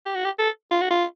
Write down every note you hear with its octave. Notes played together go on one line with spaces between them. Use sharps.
G4
F#4
G4
A4
F4
F#4
F4